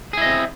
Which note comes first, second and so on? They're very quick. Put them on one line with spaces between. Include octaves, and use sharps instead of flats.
G#4 E4 D#5 C4